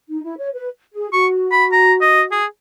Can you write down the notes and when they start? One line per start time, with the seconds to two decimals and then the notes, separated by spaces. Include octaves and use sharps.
0.09 D#4
0.23 E4
0.38 C#5
0.54 B4
0.93 G#4
1.12 F#4 C#6
1.52 B5
1.72 A#5
2.01 D#5
2.31 G#4